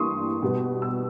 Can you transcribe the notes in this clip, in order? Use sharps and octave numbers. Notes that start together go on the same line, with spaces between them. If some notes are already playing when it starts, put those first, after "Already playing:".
Already playing: G2 E3 G3 A#3 C6 C#6 D#6
B2 G3 B3
E6